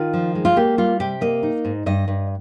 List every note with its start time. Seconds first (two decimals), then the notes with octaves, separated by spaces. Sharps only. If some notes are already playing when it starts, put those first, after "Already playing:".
Already playing: D#3 F4
0.13 F3
0.35 G#3
0.45 F4
0.56 A#3 G4
0.78 G3 F4
1.00 C3 G4
1.21 A#3 D#5
1.43 D#4
1.65 G#2
1.86 G2 D#5
2.08 G2